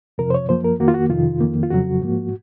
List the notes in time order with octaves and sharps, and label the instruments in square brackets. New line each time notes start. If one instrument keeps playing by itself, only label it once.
[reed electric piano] F2 C3 F3 A#4
C5
C#5
F#2 F3 A#3 C5
A#4
F2 D#3 A#3 F#4
F4
F#4
F2 C3 D#3 F4
F2 D#3 A#3
F4
F2 C#3 F#3 F#4
G#2 F3 A#3